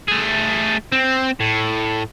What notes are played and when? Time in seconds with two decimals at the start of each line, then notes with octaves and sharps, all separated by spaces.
0.08 A3 G#4
0.92 C4
1.40 A2